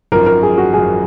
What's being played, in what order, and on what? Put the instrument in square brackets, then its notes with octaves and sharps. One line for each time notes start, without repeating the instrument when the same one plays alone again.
[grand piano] G#1 F#2 F3 [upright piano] A#4
[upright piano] A#4
G#4
F#4
[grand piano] G#1 F#2 F3 [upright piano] G#4